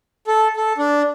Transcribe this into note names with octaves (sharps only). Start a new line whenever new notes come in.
A4
A4
D4